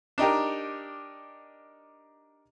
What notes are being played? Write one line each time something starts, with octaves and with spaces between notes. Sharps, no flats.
D4 D#4 G4 A#4